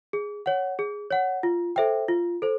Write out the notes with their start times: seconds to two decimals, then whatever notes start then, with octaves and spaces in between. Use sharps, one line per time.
0.13 G#4
0.46 C#5 F#5
0.79 G#4
1.11 C#5 F#5
1.43 F4
1.76 A4 C5 E5 G5
2.08 F4
2.42 A4 C5